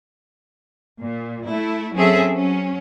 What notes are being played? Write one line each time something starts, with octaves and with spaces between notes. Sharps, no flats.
A#2
A3 E4
F#3 C4 C#4 G#4 A4 E5
F#3 C#4